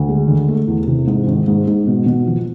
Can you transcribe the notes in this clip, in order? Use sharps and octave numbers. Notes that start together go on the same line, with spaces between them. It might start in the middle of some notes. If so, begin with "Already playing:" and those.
Already playing: D2
G#3
D3
A3
E2
C3
G#2
G#1
G#2
G#2
B2
B2
F3